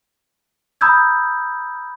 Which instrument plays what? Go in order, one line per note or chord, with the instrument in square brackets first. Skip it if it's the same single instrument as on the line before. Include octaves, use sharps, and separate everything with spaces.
[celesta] A#5 B5 D#6 E6 G6 G#6